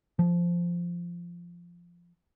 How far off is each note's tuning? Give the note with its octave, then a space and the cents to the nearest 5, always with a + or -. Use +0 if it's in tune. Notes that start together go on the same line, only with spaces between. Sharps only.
F3 -10